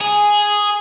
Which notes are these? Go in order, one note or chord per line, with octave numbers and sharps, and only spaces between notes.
G#4